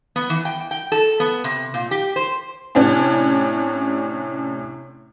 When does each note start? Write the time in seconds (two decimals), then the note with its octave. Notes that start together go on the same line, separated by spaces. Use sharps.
0.16 B3
0.30 E3
0.45 G5
0.71 G5
0.92 A4
1.20 B3
1.44 C3
1.74 A#2
1.91 G4
2.16 C5
2.75 A2 C3 C#4 D4